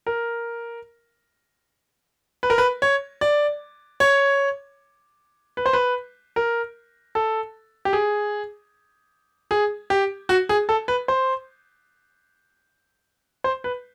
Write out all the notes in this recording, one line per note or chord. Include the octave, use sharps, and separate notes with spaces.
A#4
B4
A#4
B4
C#5
D5
C#5
B4
C5
B4
A#4
A4
G4
G#4
G#4
G4
F#4
G#4
A4
B4
C5
C5
B4